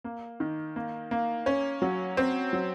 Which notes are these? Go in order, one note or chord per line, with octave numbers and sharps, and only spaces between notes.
A#3
D#3
A#3
A#3
C#4
F#3
C4
F#3